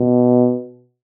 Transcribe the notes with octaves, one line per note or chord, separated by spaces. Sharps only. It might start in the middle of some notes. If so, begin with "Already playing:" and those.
Already playing: B2